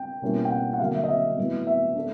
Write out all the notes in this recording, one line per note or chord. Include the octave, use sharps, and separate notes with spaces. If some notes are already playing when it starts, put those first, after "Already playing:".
Already playing: G5
B2 G3 A#3 C#4 E4
G5
F#5
F#5
D3 F#3 A#3 F5
E5
D#5
E5
A2 F#3 B3
E5
A3 D4